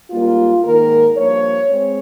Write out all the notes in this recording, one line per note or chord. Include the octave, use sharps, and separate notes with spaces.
G#2 G3 A#3 F4
G#2 D#3 A#3 A#4
G2 F3 A#3 C#5
G#3 C4 C#5